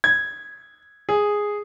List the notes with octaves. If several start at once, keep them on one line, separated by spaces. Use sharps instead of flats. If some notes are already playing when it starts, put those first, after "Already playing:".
G#6
G#4